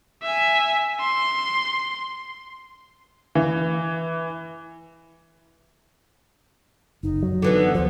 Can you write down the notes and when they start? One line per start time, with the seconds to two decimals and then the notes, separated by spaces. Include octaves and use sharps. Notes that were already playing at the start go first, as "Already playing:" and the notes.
0.23 E5 G#5
1.00 C6
3.35 E3
7.03 F#1 D#4
7.23 F#3
7.42 D3 E3 B3
7.75 D#2 F3 C5